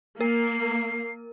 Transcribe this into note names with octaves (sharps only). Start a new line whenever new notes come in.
A#3 A#4 C7